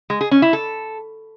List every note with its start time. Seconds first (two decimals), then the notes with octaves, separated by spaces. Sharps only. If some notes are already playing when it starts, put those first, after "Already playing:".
0.10 G#3
0.21 G#4
0.31 C#4
0.42 E4
0.53 A4